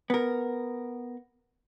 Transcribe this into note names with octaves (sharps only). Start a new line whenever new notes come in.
B3 A#4